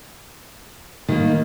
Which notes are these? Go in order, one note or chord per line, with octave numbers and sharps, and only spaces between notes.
A2 D#3 G#3 A#3